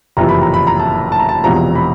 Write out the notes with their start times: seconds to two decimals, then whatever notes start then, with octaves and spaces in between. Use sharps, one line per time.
0.17 F#1 F2 C3 E3 A#5
0.29 B5
0.42 A#5
0.54 B5
0.67 A#5
0.80 A5
1.12 A5
1.20 A#5
1.29 A5
1.44 E1 E2 C3 F3 A#5
1.75 B5